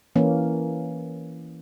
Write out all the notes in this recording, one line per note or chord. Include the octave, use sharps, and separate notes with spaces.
E3 A#3 C#4